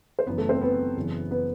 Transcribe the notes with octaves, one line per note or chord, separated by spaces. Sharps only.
C5
F#1 F#2 E3 B3 B4
A3 A4
C4 C5
B3 B4
F#1 F#2 E3
B3 B4